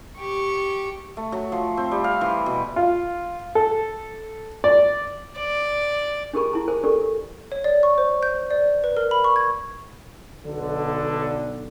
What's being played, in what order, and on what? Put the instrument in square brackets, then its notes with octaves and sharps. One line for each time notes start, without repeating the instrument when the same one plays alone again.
[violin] G4 C#6
[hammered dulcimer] A3
F#3
F3
C4
G3
F5
E3
B2
[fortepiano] F4
A4
D5
[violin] D5
[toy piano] D4 G4 G#4 A#4 B5 C#6
E4 A5 A#5
G#4 A#4 C5 G#5
D4 G4 A4 A#4 D5
[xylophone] C#5
D5
C#6
C5
G6
D5
B4
A#4
B5
C#6
G#6
[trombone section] B1 D3